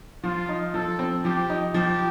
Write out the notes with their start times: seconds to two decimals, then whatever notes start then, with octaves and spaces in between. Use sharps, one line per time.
0.24 F3 F4
0.49 D#4
0.74 F3 A4
0.99 C4
1.25 F3 G4
1.50 D#4
1.74 F3 G4